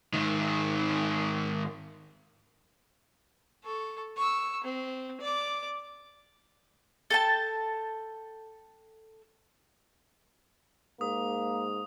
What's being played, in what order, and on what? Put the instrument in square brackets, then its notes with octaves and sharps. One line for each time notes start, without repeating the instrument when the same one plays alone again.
[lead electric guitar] G#2 D#3
[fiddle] A4 C#6
C#6 E6
C4
D5 D6
[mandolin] A4 G5 A5
[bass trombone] G#2 [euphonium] A#3 [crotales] D#6